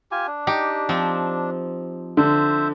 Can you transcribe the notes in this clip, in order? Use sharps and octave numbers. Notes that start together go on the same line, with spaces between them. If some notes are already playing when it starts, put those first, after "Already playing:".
F4 G4 G#5
D4
D#4 G4
F3 C4
D3 C5 E5